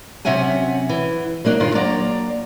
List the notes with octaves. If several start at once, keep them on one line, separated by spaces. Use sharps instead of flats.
C3 F#3 C#4 E5 F#5 G#5
E3
F#3 A#3 D4 D#4
G2 A#2 D#3 F4
F#3 A#3 D5 A#5